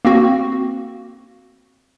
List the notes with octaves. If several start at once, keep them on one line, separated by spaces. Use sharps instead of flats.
A#3 C4 F#4